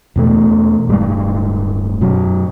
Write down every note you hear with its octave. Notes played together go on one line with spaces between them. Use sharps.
E2 B2 A3
D1 G2 G3 G#3
F#2 B2 F#3